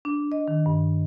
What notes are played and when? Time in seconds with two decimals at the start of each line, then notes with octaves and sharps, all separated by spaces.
0.05 D4
0.32 D#5
0.48 D#3
0.66 G2